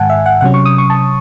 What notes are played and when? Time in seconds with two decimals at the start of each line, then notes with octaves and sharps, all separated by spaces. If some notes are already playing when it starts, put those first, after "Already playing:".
Already playing: G#2 D#3 G#3 F#5 G#5 A5
0.10 E5
0.26 F#5
0.41 C3 F#3 C#4 F#5
0.54 C#6
0.66 D#6
0.78 C#6
0.90 A5